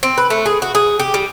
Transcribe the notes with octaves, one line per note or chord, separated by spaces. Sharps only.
C4
B4
A3
G#4
F#4
G#4
G4
G3